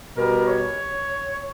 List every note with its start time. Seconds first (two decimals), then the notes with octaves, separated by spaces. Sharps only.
0.16 B2 G3 A#4
0.47 C#5